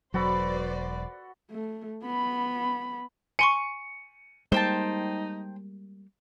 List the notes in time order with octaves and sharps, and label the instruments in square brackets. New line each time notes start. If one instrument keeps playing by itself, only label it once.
[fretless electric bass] E1 F#3 [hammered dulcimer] F#4 A4 B5 [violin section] B4 C5 D5
[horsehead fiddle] A3
B3 B5
[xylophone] G#5 C6 C#6 [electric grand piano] C#7 D#7
[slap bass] G3 G#3 A#3 [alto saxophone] D#4 [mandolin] C5 G5 A5